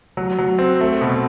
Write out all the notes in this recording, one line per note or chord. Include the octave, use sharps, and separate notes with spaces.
F#3
F#3
C4
A3
B2